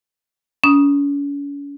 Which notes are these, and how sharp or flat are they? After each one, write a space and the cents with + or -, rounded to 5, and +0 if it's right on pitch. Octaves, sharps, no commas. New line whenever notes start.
C#4 +40 A#5 +45 D#6 +0